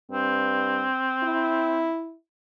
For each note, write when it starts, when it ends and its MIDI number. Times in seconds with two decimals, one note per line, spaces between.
0.11 0.86 43
0.11 1.90 60
1.23 2.15 64